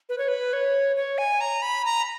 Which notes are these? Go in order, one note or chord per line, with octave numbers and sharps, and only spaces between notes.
B4
C#5
B4
C#5
C#5
G#5
A#5
B5
A#5